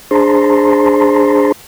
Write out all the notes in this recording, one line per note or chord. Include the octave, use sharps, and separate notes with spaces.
D4 G#4 C5 A5 A#5 C6